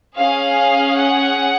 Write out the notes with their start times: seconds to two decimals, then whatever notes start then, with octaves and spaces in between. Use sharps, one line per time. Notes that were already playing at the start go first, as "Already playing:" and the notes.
0.17 C#4 G#4 F5
0.97 F#5